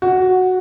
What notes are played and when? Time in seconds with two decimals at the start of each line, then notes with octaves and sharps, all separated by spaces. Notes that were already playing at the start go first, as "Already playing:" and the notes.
0.02 F#4